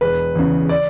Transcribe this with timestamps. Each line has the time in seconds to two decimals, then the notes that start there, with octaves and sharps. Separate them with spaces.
0.01 E1 B4
0.35 E2 C#3
0.69 D5